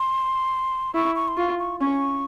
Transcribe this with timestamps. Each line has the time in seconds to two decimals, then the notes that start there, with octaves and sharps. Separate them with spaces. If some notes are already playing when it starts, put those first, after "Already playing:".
Already playing: C6
0.94 E4 C#6
1.16 C#6
1.28 C6
1.37 F4 C#6
1.59 C#6
1.80 C#4 C#6